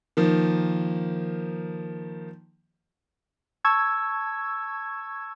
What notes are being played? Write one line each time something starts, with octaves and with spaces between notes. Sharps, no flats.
D#3 F3 A#3
A5 C#6 E6 G#6